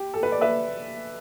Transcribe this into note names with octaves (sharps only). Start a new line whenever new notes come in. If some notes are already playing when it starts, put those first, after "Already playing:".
Already playing: G4
A4
B4
D5
B4 E5